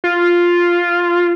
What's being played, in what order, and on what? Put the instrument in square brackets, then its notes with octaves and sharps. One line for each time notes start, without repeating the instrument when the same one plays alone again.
[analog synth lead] F4